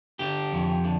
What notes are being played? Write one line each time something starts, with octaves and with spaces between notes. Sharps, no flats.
D3 G4
F2
D3